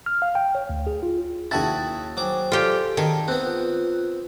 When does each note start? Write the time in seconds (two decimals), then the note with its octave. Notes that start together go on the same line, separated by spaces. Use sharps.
0.06 F6
0.22 F5
0.35 G5
0.55 C#5
0.70 D2
0.87 G#4
1.03 F4
1.51 D#2 E4 F#4 G#4 G5 A5 D#6 A6
2.17 F#3 C5 G5 G#5 D6
2.52 F4 G4 A4 D5 D7
2.97 D#3 G#4 A5
3.28 B3 C4 F#6
3.44 F4